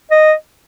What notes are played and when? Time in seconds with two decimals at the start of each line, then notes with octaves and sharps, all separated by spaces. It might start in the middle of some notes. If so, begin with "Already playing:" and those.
0.11 D#5